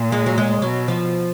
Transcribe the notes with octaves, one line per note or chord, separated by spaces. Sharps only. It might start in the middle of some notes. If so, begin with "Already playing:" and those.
Already playing: A#2
G#3
F#3
G#3
B2 F#3
F3